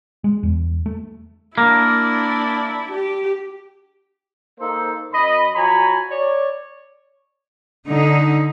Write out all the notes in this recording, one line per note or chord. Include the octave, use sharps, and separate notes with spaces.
G#3
E2
A3
A#3 D4 E4
G4
A#3 D#4 A4 C5
F#2 D#5 B5
F3 F#4 C#5 G#5 A#5 B5
C#5 D5
D3 D#4